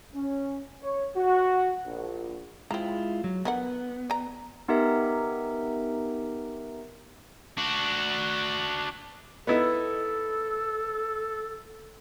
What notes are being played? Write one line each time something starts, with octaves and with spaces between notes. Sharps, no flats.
C#4
C#5
F#4
A#1
G#3 C4 E4 F4 A#5
F#3
D3 B3 A#4 F#5
D5 A#5
B3 D#4 G4 A#4 E5
D4 F#4
B3 D#4 E4 A4